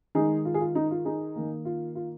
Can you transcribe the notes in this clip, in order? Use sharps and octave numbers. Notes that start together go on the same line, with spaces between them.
D#3 G#3 D#4 G#4
F4
G#4
F4
D#4
F4
D#4 G#4
D#3 A#3
F4
F4